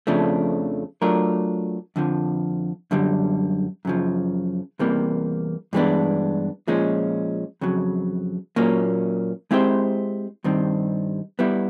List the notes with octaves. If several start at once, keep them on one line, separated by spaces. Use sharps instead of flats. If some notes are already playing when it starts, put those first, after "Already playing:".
F2 C#3 F3 A3 D4
F#3 A3 D4 F4 A#4
F2 D3 F3
F#2 D3 G3
F#2 C#3 F3
E2 C3 E3 G3 A#3
G2 E3 G#3 B3 D4
A#2 F3 G#3 C#4
F2 C#3 F#3
A#2 F#3 A#3 C#4
G#3 C4 E4 G4 C5
G2 D#3 G3 C4
G3 B3 E4